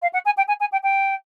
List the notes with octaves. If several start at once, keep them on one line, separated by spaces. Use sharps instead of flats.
F5
F#5
G#5
G5
G#5
G#5
G5
G5